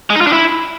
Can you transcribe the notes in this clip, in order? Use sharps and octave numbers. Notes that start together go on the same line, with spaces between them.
G#3
D#4
F4
D4
E4